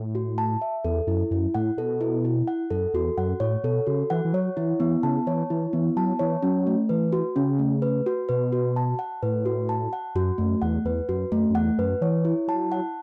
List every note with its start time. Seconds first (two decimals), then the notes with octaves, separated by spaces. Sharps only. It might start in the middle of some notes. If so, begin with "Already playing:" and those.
Already playing: A2
0.15 F#4
0.38 A5
0.62 E5
0.85 E2 A4
1.07 F#2 E4
1.31 F#2 E4
1.54 A2 F#5
1.77 B2 A4
2.01 E4
2.25 E4
2.47 F#5
2.70 F#2 A4
2.94 E2 F#4
3.17 F#2 F#5
3.40 A2 C#5
3.64 B2 A4
3.87 C#3 F#4
4.10 E3 F#5
4.25 E3
4.33 F#3 C#5
4.57 E3 E4
4.80 E3 B3
5.03 C#3 A5
5.27 E3 C#5
5.50 E3 E4
5.73 E3 B3
5.97 F#3 A5
6.19 E3 C#5
6.43 F#3 C#4
6.67 A3
6.89 E3 B4
7.13 F#4
7.36 C#3 C#4
7.59 A3
7.82 B4
8.06 F#4
8.29 B2 B4
8.52 F#4
8.76 A5
8.99 F#5
9.23 A2 B4
9.46 F#4
9.69 A5
9.93 F#5
10.15 F#2 F#4
10.38 F#2 A3
10.62 E2 F#5
10.85 E2 B4
11.09 F#2 F#4
11.31 F#2 A3
11.50 F#2
11.54 E2 F#5
11.78 F#2 B4
12.01 E3 C#5
12.25 E4
12.48 F#3 A5
12.72 F#5